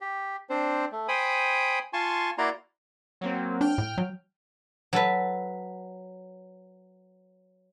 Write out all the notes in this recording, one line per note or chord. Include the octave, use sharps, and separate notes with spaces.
G4
C4 D4 C5
A3
C5 G5 G#5 B5 D#6
F4 G#5 A5 C6 C#6
A#3 E4 F#4 D5 A#5 C6
F#3 A#3 C4
D4 G5 F6
A2
F#3
F#3 A4 B4